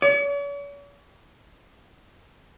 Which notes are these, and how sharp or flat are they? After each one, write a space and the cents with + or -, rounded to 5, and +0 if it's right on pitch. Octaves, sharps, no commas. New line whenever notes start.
C#5 +45